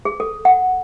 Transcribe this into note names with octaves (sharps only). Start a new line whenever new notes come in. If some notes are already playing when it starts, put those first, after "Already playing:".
G#4
A4
F#5